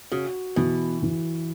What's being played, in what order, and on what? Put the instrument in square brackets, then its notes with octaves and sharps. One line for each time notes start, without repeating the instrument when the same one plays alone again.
[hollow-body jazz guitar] C#3 [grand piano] F#4
[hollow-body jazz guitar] B2 [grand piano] E3
[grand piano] E3